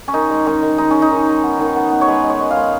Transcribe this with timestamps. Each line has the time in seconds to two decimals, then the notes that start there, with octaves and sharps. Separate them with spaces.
0.08 C#4
0.13 D#3 D#4
0.30 G#3
0.46 D#3 C#4
0.62 D#3
0.78 G#3 D#4
0.91 G#3 C#4
1.02 D#4
1.11 D#3
1.28 G#3
1.43 B3
1.59 D#3
1.76 B3
1.91 B3
2.01 C#5
2.08 G#3 B4
2.24 G#3
2.30 C#5
2.40 G#3
2.51 F5
2.57 G#3